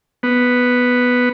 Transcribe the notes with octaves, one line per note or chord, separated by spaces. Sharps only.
B3